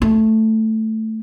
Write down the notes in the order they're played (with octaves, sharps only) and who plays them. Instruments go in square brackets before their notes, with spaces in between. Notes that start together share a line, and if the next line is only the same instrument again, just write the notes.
[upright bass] A3